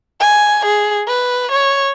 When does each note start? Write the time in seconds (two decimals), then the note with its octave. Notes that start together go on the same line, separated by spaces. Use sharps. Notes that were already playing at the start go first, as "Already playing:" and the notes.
0.20 G#5
0.65 G#4
1.07 B4
1.51 C#5